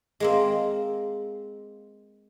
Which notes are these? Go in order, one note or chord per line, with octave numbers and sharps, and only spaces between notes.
G#3 A#3 C4